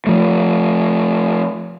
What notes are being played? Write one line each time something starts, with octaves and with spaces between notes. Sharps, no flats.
F3 A3